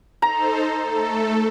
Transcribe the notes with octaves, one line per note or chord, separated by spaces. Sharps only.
D#4 A4 C5 A#5
A3 A4